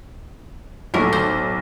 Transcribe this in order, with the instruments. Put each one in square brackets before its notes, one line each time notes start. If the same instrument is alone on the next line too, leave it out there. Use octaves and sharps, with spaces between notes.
[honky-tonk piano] B1 [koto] A2 A#4
[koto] C5